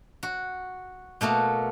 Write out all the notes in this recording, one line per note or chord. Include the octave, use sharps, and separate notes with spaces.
F#4
B2 A3 A#3 F#4